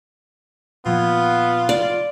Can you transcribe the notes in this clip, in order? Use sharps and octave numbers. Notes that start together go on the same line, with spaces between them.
A#2 F3 B3 F4
D5